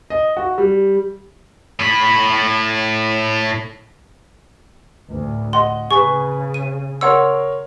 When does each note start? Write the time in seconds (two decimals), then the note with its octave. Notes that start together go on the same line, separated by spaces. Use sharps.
0.10 D#5
0.37 F#4
0.58 G3
1.80 A2 B5
5.10 D2 A2
5.53 D#5 F#5 C6
5.91 C#3 G#4 B4 C#6
6.54 D#7
7.01 A#4 C#5 F#5 C6 E6